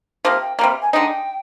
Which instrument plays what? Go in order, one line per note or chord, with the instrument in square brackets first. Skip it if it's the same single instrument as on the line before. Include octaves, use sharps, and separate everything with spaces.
[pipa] C3 F3 A#3
[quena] G5
[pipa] C3 G3 A#3 [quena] A#5
[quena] G#5
[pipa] D3 G#3 D#4 [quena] G5 G#5